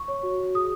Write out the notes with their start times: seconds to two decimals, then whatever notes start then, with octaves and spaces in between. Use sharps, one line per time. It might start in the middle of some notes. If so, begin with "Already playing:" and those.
Already playing: C#6
0.08 C#5
0.23 F#4
0.40 F#4
0.55 G#4 D#6